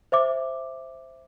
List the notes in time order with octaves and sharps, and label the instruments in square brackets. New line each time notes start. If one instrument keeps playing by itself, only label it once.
[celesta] C5 E5 D6